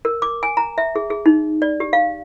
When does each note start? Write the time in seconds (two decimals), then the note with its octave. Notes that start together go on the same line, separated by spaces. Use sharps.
0.05 A#4
0.22 D6
0.43 G#5
0.57 A#5
0.78 E5
0.96 G#4
1.10 G#4
1.26 D#4
1.62 D5
1.80 G4
1.93 F5